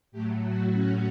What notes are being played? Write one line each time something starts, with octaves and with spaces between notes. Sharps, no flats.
A2 F#3 A3 G4
F#4
C#4